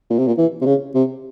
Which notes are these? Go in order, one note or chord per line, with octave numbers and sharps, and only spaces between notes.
A#2
C3
A#2
E3
C3
C#3
C3